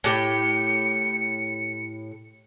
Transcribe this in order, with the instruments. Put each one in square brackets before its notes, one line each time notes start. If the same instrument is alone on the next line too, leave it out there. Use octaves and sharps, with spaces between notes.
[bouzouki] A2 G4 [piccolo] C#7